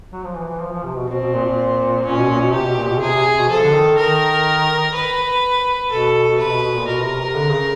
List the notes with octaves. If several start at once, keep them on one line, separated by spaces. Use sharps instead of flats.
F#3
F3
E3
E3
F3
F3
C3
B2
B2 C4
B2
A#2
A#2
A#2 C#4
B2
A#2
B2
C3 G4
B2
A#2
B2
C#3
C3 G#4
C3
B2
F3 A4
D3
D#3
D#3 A#4
B4
B2 A4
B2
C3 B4
B2
B2
A#2
B2 A#4
C3
C3
D3
C#3